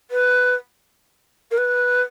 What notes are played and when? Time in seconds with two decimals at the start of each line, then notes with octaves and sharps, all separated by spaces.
0.10 B4
1.51 A#4
1.57 B4